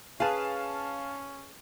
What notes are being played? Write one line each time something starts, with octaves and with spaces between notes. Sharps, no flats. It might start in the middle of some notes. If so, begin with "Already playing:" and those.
C#4 G#4 B4 F5 A5